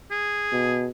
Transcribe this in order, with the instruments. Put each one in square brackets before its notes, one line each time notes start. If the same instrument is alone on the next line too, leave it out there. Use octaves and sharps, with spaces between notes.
[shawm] G#4
[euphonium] B2